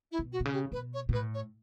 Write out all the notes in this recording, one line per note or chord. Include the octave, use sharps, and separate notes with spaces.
E4
B2
F#4
B2
C#3
G4
B2 B4
C#5
B2
A2 B4
C#5